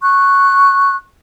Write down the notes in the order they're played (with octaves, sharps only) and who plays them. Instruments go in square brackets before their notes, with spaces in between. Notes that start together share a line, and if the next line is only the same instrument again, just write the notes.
[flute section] C#6 F#6